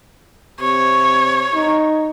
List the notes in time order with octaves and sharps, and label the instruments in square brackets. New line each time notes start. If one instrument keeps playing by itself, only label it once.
[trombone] C3 [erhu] C#5
[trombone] D#4